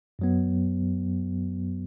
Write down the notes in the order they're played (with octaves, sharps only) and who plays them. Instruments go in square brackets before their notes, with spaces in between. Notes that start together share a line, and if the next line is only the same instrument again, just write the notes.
[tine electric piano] F#2 F#3 B3